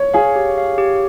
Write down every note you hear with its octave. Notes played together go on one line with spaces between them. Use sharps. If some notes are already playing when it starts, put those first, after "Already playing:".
Already playing: C#5
G#4 F5
G4
F5
G4